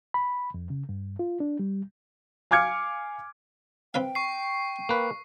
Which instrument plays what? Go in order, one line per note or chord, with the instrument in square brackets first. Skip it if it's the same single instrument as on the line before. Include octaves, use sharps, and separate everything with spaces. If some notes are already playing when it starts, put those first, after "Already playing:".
[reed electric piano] B5
F2
C#3
G2
F4
D4
G3
[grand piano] F5 G#5 D6 F6 G#6 C#7
[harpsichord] C4 B4 F5 [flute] G5
[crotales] C#6 C7
[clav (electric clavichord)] A#3 B4